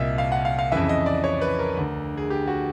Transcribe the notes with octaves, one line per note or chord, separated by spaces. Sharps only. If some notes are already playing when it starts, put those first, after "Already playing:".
Already playing: C2 A#2 D#5 E5
F5
F#5
F5
F5
F2 C#3 E3 E5
D#5
D5
C#5
B4
A#4
D2 D3
G#4
G4
F#4